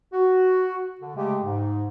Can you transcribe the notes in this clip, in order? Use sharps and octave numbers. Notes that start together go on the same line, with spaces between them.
F#4
D3
C#3 G#3 A3 G4
G#2